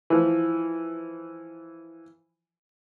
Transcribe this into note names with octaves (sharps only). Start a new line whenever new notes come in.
E3 F3